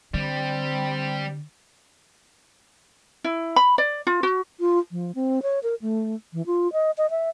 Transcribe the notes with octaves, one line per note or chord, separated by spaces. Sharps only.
D3 G3 C4
E4
B5
D5
F4
F#4
F4
F3
C4
C#5
A#4
A3
E3
F4
D#5
D#5
E5